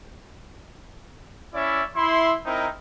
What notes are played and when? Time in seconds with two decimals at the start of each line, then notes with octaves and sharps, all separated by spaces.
1.54 C#4 E4 D5 E5
1.96 E4 C6
2.45 C4 D#4 E4 A#4